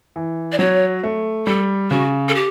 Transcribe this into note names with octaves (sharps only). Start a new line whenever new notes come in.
E3
D5
F#3 C#5
A3
G3 A4
C#3 F#4
A4
G4